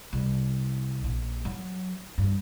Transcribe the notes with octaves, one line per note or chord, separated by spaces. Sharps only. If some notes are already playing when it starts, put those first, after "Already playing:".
C2
A#1
F#3
G2